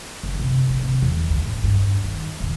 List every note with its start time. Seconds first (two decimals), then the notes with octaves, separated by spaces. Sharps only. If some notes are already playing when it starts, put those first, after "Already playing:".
0.23 F#1
0.39 C3
0.70 C3
0.83 C3
1.02 E2
1.30 D2
1.45 A2
1.64 G2
2.04 D#3
2.40 D#1